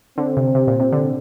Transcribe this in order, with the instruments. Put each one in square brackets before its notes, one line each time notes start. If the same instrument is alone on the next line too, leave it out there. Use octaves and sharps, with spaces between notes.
[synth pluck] D3 [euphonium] C4
[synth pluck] C3
C3
A#2
C3
D3